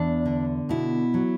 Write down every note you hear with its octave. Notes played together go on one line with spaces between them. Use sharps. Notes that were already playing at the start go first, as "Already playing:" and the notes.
Already playing: E2 D4
D3
B2 E4
F#3